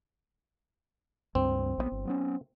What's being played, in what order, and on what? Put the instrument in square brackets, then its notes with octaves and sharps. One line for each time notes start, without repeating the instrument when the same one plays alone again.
[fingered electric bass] C#2 G2 [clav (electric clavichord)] C4
[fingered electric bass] A#1 D#3 B3
G1
F#3 B3 C#4